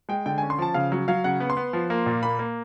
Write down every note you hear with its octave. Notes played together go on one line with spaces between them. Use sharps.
G#3 G5
D3 G5
C#4 G#5
C6
F3 A5
C#3 F5
F#3
F#3 F5
C#3 F#5
B3
C6
B3
F3
A#3
A#2
A#3 B5
A#3